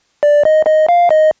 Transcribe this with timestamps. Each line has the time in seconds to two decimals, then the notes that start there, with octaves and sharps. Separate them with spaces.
0.23 D5
0.45 D#5
0.66 D#5
0.89 F5
1.11 D#5